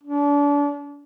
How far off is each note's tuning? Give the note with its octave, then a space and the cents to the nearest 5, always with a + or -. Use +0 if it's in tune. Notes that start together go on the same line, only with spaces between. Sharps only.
D4 -30